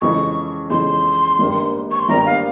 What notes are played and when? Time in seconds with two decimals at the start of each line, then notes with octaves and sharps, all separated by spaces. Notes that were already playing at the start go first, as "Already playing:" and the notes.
0.01 F2 C#3 E3 G#3 C#6
0.70 F2 C#3 E3 G#3 C6
1.39 G#1 G2 G3 A#3
1.91 C#6
2.00 C6
2.09 G#1 G2 G3 A#3 A#5
2.26 F5